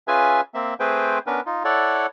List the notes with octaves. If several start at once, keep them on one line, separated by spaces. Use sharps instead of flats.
C#4 F4 G#4 B4 E5 G#5
A#3 C4 E5
A3 C4 G#4 B4 C5 G5
B3 C#4 D4 A#4 B4
D#4 F4
E4 A4 C#5 D5 F#5